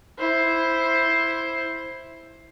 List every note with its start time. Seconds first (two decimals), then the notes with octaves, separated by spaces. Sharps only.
0.18 E4 C5